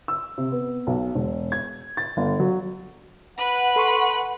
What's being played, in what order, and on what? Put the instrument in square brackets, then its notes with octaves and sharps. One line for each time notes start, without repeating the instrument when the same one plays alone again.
[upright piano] E6
C3
B3
B1
E1
G#6
A6
G1
F#3
[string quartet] B4 F#6 [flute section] F#5
[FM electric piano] A4 C6 C#6